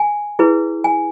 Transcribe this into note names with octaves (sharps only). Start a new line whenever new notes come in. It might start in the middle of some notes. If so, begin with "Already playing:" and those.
Already playing: G#5
E4 G#4 B4
G#5